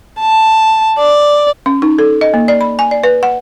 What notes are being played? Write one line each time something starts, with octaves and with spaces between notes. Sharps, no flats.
A5
D5
C#4
D#4
A4
D#5
A#3
D5
B5
G#5
D5
B4
F#5